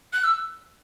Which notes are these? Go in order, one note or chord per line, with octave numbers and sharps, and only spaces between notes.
F#6
E6